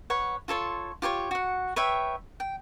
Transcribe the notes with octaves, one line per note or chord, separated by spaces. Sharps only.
B4 C#5 F#5
F4 A4 C#5 C6
F4 G4 C5 C#5
F#4 F#5
B4 C#5 E5 G5
G5